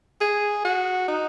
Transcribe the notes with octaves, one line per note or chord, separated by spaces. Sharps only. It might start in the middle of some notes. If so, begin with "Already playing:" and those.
G#4
F#4
D#4